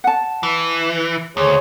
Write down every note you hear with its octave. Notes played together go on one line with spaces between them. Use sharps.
F#5 A5
E3
D2 G#4 C5 C#5